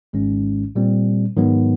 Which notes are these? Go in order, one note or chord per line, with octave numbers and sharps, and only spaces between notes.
G#1 G#2 D#3 G#3 C#4
A#2 G3 C4
G#2 D#3 F#3 B3